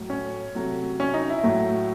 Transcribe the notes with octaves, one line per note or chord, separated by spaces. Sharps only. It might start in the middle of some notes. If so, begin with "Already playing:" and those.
Already playing: A2 F#3 A3
C#4
C3 F#3 A3
C#4
D#4
E4
A2 F#3 A3